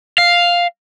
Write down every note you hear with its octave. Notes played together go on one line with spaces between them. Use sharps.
F5